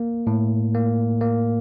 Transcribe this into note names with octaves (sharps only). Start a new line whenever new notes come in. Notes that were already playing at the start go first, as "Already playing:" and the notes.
Already playing: A#3
A2
A#3
A#3